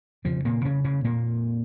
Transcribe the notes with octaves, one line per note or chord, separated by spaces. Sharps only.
F2 C#3 F3
A#2 A#3
C#3 C#4
C#3 C#4
A#2 A#3